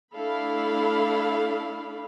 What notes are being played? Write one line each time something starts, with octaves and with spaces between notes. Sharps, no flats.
A3 D4 E4 A4 F5 B5